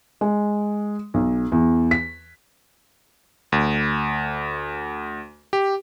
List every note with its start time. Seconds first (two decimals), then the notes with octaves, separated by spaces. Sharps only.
0.21 G#3
1.14 B1
1.52 E2
1.91 B6
3.52 D2
5.53 G4